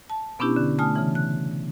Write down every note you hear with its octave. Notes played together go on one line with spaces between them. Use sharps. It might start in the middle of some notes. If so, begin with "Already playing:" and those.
A5
B2 B3 C#4 D4 E4 G4
D3
A3 G#5 A5 D#6 F6
C#3 E3
F#6